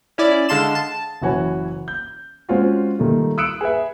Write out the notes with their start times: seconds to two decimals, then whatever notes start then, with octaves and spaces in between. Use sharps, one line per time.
0.18 C#4 E4 D5
0.49 D3 G#3 F5 A5 C6 E7
0.75 A5
1.22 F#1 E3 F#4 C#5 G#5
1.88 G6
2.49 G#3 C4 C#4 F4 F#4
2.99 A#2 D#3 G3 A3
3.38 D#6 E6 F#6 C#7 D7 E7
3.61 G#4 B4 E5